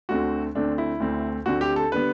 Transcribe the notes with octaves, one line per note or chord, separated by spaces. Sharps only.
D2 D3 A3 C4 F#4
D2 D3 A3 C4 D4
E4
D2 D3 A3 C4
D2 D3 A3 C4 F#4
G4
A4
D3 G3 B3 B4